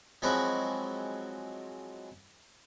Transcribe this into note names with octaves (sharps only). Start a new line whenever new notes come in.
F3 F#3 G#3 C4 E4 F#4